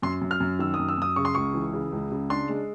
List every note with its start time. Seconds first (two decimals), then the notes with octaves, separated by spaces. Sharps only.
0.02 F#2 C6
0.21 F#2
0.31 F6
0.40 F#2
0.59 D#3 E6
0.74 D#6
0.79 F#2
0.89 E6
0.98 F#2 D#6
1.16 C#3 C#6
1.25 C6
1.35 C#2 C#6
1.54 E3
1.73 C#3
1.92 C#2
2.11 C#3
2.30 D4 C6
2.49 G#3